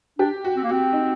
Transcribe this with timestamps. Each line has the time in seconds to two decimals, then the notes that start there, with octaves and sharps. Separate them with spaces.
0.19 D4 G4
0.44 F#4
0.57 C4
0.64 A#3
0.69 C4 F#4
0.93 D#4